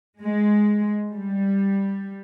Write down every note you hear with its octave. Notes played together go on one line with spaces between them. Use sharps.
G#3
G3